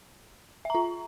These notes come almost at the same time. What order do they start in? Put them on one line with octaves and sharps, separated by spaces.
E5 A#5 F4